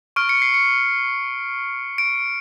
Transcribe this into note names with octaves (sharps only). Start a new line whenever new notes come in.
C#6 F6 D7
C#7
C7
C#7
D7